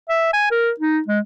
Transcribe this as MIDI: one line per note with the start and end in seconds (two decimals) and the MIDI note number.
0.10 0.33 76
0.33 0.51 80
0.51 0.71 70
0.80 1.00 63
1.08 1.20 56